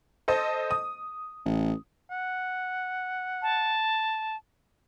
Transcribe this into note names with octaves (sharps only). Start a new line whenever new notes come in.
A4 C5 D#5
D#6
A1
F#5
A5